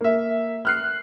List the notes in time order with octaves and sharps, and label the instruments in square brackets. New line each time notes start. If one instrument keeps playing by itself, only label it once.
[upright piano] A#3 E5
F6 F#6 C7